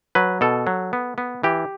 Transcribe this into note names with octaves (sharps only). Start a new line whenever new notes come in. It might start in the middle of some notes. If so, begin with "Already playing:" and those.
F#3 B4
B2 A4
F#3
B3
B3
E3 G4